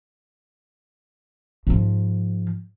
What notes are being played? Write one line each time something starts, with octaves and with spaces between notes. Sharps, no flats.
G#2 F3